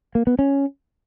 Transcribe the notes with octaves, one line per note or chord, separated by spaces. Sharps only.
A#3
B3
C#4